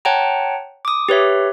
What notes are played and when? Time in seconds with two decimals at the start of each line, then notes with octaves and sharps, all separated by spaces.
0.05 C#5 F#5 G5 A5 A#5
0.85 D6 D#6
1.09 G4 B4 C#5 E5